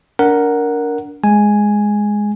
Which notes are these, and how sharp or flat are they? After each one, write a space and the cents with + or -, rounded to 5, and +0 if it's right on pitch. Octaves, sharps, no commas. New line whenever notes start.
D4 -30 A#4 +0 F#5 +0
G#3 +0 G#5 +0